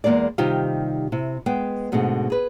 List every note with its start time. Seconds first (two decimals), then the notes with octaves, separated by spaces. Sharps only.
0.04 E2 G#3 A#3 G#4 D5
0.38 C3 D#3 G3 D#4 F4 G4
1.12 C3 E4
1.46 G#3 B3 G5
1.92 G#2 B2 D3 G#3 A3 C4
2.30 G#4 B4